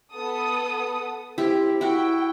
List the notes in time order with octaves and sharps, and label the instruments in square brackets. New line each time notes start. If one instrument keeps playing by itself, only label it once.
[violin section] B3 A4 D#6
[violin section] C4 [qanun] E4 G4
[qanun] E4 F#4 [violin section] G5